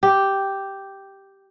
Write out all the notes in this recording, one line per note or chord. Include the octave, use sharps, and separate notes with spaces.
G4